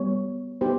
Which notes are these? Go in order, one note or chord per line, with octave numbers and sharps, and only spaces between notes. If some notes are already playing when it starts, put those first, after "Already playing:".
Already playing: G3 B3 C#5
B3 D#4 G4 C5